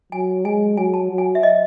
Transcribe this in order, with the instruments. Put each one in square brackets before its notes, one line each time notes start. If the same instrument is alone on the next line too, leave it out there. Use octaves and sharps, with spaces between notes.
[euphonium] F#3 [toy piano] G#5
[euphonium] G#3 [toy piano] G#5
[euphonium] F#3 [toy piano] G#5
[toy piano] A5
[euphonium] F#3
[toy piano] G#5
E5
D#5